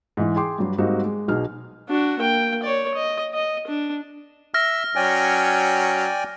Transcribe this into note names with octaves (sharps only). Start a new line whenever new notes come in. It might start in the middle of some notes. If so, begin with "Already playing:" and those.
G#2 E3 G#3
G#4 G5 C6 D6
G2 F#3
G#2 G3 A#3 C4 D#4 F#4
G#3
B1 B2 D#4 G#4 F6
D4 F#4
A#3 G5
C#5 D5
D#5
D#5
D4
E5 E6 F6 A#6
F#3 C#4 D5 G5 G#5